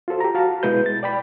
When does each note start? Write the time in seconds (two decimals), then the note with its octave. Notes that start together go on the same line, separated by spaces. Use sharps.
0.08 F4 F#4 A4 C5
0.20 G4 A#5
0.34 F#4 F5 A5
0.63 B2 G#3 E4 B4 G6
0.86 A6
1.03 D5 G5 B5